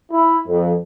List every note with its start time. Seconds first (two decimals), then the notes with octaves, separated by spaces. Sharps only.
0.12 E4
0.47 F2